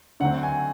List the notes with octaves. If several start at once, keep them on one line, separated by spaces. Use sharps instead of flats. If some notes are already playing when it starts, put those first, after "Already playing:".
D3 F#3 A3 C4 F#5
G#5